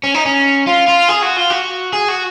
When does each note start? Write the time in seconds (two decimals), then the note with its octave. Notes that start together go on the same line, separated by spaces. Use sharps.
0.04 C#4
0.15 D#4
0.26 C#4
0.67 F4
0.88 F4
1.09 G#4
1.23 F#4
1.37 F4
1.50 F#4
1.93 G#4
2.08 F#4